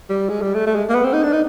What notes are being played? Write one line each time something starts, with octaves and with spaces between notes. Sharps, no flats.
G3
G#3
G3
A3
A3
G#3
A#3
B3
C4
D#4
D4
D#4